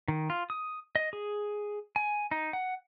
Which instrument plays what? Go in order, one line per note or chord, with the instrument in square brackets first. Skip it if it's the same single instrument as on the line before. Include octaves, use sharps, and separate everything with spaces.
[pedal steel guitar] D#3
F4
D#6
D#5
G#4
G#5
D#4
F#5